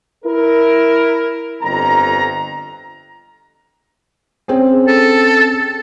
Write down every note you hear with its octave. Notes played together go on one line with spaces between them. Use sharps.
E4 A#4
G1 F2 A#5
C4 C#4 G#4
A4